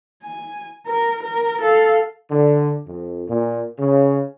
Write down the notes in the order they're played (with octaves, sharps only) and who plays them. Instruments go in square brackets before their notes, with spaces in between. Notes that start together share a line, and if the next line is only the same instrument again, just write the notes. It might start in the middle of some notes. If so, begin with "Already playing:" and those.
[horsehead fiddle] G#5
A#4
A#4
A4 F5
[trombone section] D3
F2
A#2
C#3